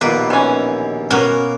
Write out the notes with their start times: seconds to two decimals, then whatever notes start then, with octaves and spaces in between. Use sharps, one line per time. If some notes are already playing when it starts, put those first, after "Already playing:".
0.01 A#1 D#2 B2 A#3 B4
0.30 E3 C#4
1.11 B2 A#3 C#4 F#4 A#4